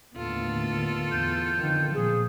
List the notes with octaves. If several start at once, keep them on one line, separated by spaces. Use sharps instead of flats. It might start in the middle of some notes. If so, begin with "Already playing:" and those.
D#2 A2 D3 B3 F4 A4
E2 G6
F2 D3 D#3
A#2 F3 G#4